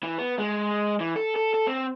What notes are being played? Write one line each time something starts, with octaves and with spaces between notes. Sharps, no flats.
E3
B3
G#3
E3
A4
A4
A4
C4